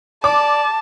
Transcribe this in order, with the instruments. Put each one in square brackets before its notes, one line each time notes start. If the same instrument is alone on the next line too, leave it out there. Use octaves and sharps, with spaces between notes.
[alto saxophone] D5 [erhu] A5 [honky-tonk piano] D6